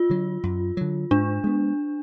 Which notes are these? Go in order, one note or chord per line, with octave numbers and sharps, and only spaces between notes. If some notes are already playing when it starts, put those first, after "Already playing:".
Already playing: F4
D3 F#3
F#2
D3 F#3
G#2 D4
G#3 B3